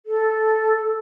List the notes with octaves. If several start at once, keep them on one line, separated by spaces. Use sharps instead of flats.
A4